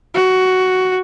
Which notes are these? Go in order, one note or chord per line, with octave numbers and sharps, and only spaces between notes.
F#4